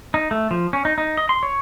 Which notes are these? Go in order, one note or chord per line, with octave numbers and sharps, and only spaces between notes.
D#4
A3
F3
C#4
D#4
D#4
D#5
C6
C#5